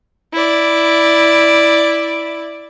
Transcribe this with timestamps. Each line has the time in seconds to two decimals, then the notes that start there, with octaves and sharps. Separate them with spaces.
0.33 E4 D5